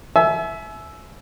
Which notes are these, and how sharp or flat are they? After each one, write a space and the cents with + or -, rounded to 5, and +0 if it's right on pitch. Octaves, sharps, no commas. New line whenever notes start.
E5 +0 G#5 +40